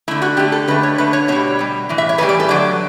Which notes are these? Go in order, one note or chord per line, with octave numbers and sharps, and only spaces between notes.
D3 A3 E4
F#4
D3 A3 G4
A4
D3 A3 B4
C#5
D3 A3 B4
C#5
B2 G3 C#5
B2 G3
A2 E3
E5
C#5
A2 E3 G3 B4
D5
A4
D3 F#3 A3 D5